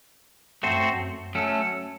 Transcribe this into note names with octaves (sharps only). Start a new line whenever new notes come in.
F#2 A3 C4 F#4 C5
F#3 A3 C#4 A4